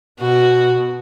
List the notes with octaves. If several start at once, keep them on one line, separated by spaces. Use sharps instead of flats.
B2 F#4